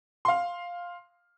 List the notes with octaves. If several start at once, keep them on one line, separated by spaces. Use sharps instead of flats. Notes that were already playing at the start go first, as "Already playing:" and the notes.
F5 C6